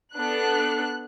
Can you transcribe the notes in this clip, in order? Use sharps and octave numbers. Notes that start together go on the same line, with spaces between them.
B3 D4 A4 F#6